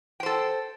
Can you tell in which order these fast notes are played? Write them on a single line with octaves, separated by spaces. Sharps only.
G5 C5 A4